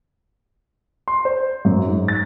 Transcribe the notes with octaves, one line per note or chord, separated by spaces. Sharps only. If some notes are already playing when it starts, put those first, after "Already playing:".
C6
C5
F#2
G#2
A6